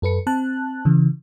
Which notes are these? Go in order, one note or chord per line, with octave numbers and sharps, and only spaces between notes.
F#2 A4 B4 C#7
C4 A5 F#6
C#3 E3